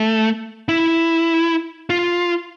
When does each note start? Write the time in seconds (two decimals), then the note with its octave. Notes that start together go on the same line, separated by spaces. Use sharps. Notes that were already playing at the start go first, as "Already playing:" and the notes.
Already playing: A3
0.69 E4
1.90 F4